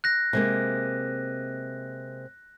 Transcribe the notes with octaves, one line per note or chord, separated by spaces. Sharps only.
F#6 A#6
C3 G#3 A#3